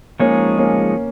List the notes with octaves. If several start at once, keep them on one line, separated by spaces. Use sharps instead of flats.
F3 G#3 A#3 C#4 D#4 G#4 C#5
A#3 C#4